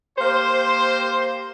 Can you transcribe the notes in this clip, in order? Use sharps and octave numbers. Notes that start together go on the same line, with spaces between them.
A#3 G4 C5